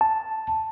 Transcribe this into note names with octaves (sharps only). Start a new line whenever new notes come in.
A5